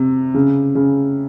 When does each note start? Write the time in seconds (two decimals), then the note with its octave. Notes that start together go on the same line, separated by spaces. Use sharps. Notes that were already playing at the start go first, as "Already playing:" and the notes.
Already playing: C3
0.34 C#3
0.75 C#3